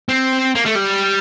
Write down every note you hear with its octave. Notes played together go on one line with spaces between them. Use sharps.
C4
A#3
A3
G3